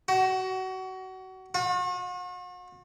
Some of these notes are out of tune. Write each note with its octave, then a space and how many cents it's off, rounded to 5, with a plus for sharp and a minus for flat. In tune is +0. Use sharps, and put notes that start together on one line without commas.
F#4 +25
F#4 -45